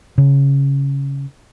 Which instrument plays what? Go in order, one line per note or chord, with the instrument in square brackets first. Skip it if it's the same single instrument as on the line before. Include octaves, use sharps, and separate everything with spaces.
[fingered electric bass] C#3